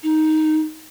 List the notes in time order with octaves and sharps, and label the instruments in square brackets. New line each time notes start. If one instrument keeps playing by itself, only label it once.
[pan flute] D#4